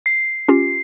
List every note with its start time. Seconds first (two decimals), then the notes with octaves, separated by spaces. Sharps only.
0.06 C7
0.48 C#4 F4 G4